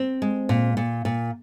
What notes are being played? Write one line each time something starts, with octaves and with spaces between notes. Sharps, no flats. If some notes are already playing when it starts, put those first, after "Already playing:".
Already playing: C4
G#3
A#2
A#2
A#2